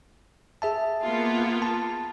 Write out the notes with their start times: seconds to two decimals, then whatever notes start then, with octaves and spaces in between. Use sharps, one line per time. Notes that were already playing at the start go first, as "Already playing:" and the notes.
0.62 G#4 E5 A5
1.02 A#3 B3 F4
1.62 A5